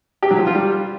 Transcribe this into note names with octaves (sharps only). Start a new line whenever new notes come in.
G4
F#3
F3
F4
G3